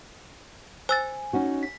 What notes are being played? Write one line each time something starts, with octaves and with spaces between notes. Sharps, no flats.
C5 G#5 E6 A6
C#4 D#4 F#4
B6